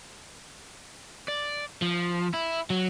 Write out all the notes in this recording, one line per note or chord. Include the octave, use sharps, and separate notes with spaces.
D5
F3
E4
F#3